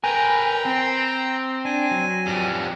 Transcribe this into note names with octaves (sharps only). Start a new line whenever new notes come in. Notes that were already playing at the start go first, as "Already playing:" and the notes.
A#4 B4 G5 G#5 A#5
C4
D4 G#5
F#3
F2 G3